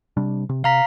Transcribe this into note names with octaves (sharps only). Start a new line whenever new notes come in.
C3 G3 D4
C3
C3 F5 A#5 B6